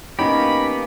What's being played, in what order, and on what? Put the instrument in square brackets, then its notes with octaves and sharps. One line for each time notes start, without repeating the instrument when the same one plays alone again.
[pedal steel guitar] A#3 B3 G4 [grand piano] C#4 D#4 [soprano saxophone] B5